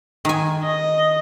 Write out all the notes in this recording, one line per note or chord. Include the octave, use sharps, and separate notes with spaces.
D#3 G#5
D#5